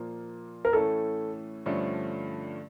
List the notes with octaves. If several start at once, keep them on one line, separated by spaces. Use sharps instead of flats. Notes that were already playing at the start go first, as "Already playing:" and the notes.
Already playing: A#2 F3 A#3
A#4
A2 E3 A3 C#4 A4
G2 D3 F3 A3 C#4